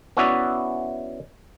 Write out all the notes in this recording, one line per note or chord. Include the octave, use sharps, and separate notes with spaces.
B3 C#4 E4 F#4 D5 E5